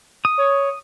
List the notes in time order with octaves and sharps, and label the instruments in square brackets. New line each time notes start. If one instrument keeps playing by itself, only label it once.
[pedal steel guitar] D#6
[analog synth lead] C#5